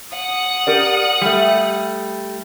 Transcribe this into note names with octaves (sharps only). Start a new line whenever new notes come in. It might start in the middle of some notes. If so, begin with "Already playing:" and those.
F#5 D#6
G4 A#4 D5
G3 A3